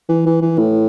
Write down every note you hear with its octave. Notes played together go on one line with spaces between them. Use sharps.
E3
E3
E3
A2